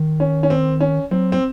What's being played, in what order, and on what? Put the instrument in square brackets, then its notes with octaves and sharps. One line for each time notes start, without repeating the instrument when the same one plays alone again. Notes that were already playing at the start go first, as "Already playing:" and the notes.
Already playing: [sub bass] D#3
[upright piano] C#4
C#4
C4
C#4
[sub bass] F#3 [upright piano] C4
[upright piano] C4